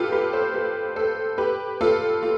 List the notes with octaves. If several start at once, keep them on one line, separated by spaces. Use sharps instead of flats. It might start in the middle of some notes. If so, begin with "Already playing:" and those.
Already playing: F4 G4 A4 B4
G4 B4
A4 C5
G4 B4
A4 C5
G4 B4
F4 A4
F4